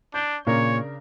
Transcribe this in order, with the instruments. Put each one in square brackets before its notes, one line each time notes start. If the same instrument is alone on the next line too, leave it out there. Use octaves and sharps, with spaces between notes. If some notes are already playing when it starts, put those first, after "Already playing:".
[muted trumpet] D4 [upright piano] G6 G7
[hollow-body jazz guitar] A#2 [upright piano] C#3 D4 A#4 [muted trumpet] C#5